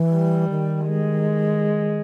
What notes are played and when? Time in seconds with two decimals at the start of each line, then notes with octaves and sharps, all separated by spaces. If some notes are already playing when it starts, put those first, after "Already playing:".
Already playing: E3
0.12 G3
0.49 D#3
0.86 G#3